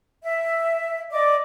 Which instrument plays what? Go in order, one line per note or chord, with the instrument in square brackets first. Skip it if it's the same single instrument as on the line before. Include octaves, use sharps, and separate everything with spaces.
[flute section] E5
D5 D#5 D6